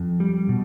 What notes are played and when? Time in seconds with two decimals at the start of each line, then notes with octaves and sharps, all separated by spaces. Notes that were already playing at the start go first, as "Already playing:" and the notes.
Already playing: F2
0.20 G3
0.49 B2